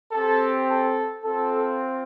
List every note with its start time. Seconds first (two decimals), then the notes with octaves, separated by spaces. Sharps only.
0.12 C4 G4 A4
0.67 A4
1.23 C4 F4 A4